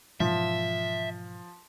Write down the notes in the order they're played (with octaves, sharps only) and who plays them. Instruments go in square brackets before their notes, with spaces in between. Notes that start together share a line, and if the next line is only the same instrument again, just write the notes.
[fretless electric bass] G#2 B2 E3 [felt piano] F3 [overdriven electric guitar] E5